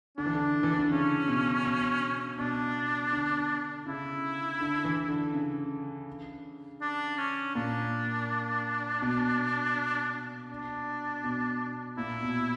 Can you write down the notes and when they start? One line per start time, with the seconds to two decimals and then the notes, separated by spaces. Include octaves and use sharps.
0.18 D3 D4
0.26 E3
0.35 D3
0.63 E3
0.78 D3
0.91 C#3 C#4
1.28 B2
1.65 B2
2.38 B2 D4
3.13 D3
3.86 C#3 E4
4.61 D3
4.84 E3
5.09 D3
5.34 C#3
6.81 D4
7.18 C#4
7.55 A#2 D4
9.02 B2
10.50 D4
11.24 B2
11.98 A#2 E4
12.22 B2